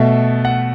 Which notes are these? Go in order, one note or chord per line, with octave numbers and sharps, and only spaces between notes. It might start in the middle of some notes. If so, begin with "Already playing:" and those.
Already playing: B2 A3 E5
F#5